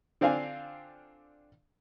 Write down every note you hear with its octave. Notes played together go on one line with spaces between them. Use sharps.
D3 C4 D4 F4 F5 G#5